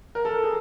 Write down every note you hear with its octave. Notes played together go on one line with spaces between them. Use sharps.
A#4
A4
G#4